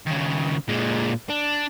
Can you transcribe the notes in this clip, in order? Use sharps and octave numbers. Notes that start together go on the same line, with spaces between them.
D#2 C#3
A#2 G#3
D4